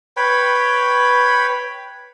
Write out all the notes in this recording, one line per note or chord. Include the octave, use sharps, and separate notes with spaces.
B4 C#5 G5 B5